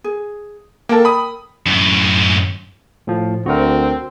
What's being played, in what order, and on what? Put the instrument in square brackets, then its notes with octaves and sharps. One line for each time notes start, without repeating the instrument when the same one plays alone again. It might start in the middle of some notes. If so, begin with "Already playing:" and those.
[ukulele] G#4
[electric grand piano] A#3 A5 [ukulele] A4 A#4 G5
[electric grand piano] B5 D#6
[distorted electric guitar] F#2 A2
[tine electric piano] A2 F3
[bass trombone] D2 [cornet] C4 [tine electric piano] F#4 A#4